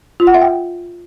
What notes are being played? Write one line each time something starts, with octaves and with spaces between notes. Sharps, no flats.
F4
F#5
E5
G5